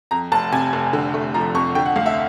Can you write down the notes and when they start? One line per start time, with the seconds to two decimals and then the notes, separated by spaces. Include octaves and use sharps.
0.11 F2 A#5
0.32 F1 A5
0.52 C3 G#5
0.73 F1
0.93 D3
1.14 A3
1.34 F3 A#5
1.55 F2 C#6
1.75 D3 G5
1.85 F#5
1.96 D2 F5
2.06 E5